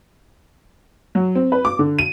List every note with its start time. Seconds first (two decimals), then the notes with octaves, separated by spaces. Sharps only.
1.15 F#3
1.35 C4
1.52 B4
1.65 D6
1.79 D3
1.99 D#7